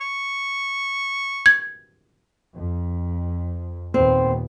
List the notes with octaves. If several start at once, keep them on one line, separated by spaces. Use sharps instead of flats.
C#6
G#6
F2
D#2 A#2 B3 C4